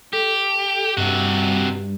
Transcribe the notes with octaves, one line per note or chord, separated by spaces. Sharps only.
G4 A4
G2 C3 F#4